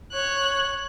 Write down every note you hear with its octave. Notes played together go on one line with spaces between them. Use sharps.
C#5 F#6